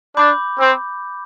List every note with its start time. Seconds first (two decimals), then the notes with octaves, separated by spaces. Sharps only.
0.16 D4 B5 D6 G6
0.59 C4